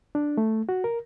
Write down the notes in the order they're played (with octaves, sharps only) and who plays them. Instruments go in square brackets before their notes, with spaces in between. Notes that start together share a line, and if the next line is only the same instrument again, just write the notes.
[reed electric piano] D4
A3
F#4
A#4